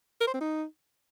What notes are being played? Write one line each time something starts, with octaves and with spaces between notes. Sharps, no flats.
A#4
C5
C4
D#4